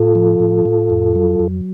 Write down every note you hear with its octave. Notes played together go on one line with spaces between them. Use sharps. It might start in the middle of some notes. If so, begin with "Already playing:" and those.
Already playing: A2 F4 A4
F3
A2
A2
F2
F#3
F2